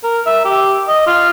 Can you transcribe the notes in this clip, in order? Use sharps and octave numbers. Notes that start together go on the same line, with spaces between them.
A#4
E5
G4
D#5
F4